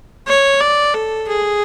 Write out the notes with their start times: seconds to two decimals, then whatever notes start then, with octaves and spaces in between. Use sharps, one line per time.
0.27 C#5
0.61 D5
0.94 A4
1.28 G#4